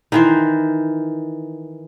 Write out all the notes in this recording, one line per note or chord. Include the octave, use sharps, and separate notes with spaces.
D#3 E3 C5